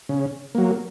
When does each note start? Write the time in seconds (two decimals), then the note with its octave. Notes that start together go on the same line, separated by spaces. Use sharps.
0.09 C#3
0.55 F#3 A#3